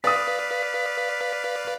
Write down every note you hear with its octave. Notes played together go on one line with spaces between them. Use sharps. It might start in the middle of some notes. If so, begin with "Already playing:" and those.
B4 D5 F5 D#6 A6 B6